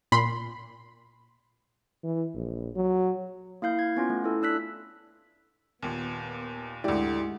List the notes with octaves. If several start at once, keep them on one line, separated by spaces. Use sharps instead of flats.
A#2 B5 C6
E3
A#1
F#3
A#3 E4 F5 G6
G#6
B3 C#4 F4
A3
E4 A4
D4 E6 F#6 B6
D#2 A#2 B3
D2 G#2 D3 E4 G4 D5